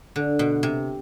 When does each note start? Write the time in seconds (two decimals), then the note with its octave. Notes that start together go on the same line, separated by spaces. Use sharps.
0.16 D3
0.39 B2
0.63 C3